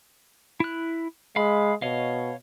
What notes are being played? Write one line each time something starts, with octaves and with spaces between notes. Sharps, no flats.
E4 F#6
G#3 F5 B5
B2 C#5 D#5 F5